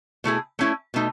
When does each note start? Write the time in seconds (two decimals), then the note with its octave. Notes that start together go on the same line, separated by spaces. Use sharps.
0.24 B2 A3 E4 G#4
0.59 A3 C#4 E4
0.94 B2 A3 D#4